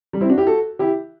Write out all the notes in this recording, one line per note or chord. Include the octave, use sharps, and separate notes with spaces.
G3
C4 E4
D4 F#4
E4 G4
F#4 A4
E4 G4